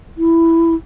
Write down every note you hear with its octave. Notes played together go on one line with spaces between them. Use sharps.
E4